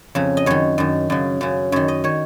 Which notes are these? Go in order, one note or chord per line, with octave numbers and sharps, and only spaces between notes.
F2 C#3
D#5
F#2 D#3 C#5
F#2 D#3
F#2 C#3
F#2 C#3
F#2 D#3 C#5
D#5
D#3 C#5